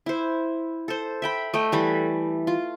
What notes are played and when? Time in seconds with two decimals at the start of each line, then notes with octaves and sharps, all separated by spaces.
0.06 E4 C5
0.88 A4 C5
1.22 E5 G5 B5
1.54 A3 D#5 G5
1.72 E3 G3 B5
2.47 F4